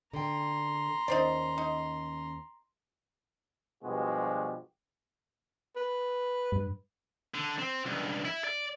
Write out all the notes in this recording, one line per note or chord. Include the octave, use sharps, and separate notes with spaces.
D3 G5 A#5 C6
D#2 C#4 D#4 C5 D5
D#4
G2 B2 F3 G#3 F#4 G4
B4
G2
D3
C4
C#2 G2
E4
D5